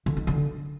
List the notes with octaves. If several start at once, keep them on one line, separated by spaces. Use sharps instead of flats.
D3
D#4
D3